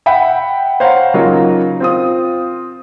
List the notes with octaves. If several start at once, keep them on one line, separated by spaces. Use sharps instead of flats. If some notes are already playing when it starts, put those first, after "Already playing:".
E5 F#5 G5 B5
C5 C#5 F5 F#5 A#5
C#3 F#3 A#3 D#4 F4 F#4
C4 F4 D#6